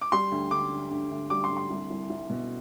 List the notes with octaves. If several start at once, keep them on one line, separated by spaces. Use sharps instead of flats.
D6
G3 C6
D2
D3 D6
D3
D2
D2
G3 D6
C6
D2
C6
C2
C2
C2
B2